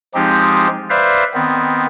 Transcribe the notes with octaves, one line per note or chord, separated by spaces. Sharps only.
F3 G#3 C4 D#4 G4
B4 C5 D5 E5 F5
D#3 B3 C4